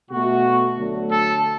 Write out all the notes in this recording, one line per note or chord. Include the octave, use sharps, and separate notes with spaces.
B2 A3 F#4
D2 D3 F#3 A3
A4